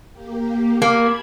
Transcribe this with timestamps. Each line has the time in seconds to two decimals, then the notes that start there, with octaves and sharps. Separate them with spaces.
0.11 A#3 G4
0.82 A#3 A5 B5 G#6